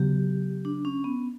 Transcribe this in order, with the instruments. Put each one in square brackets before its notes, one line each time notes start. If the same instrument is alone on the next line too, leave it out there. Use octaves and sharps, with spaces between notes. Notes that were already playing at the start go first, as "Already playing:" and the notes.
Already playing: [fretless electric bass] C#3 F#3 B3 [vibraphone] G4
[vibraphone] D4
C#4
B3